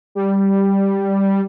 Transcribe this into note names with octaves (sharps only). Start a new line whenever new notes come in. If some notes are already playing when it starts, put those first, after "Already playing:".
G3